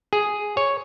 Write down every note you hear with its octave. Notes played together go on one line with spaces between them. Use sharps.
G#4
C#5